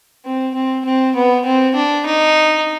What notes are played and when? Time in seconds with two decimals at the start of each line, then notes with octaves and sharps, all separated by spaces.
0.25 C4
0.54 C4
0.85 C4
1.15 B3
1.45 C4
1.75 D4
2.06 D#4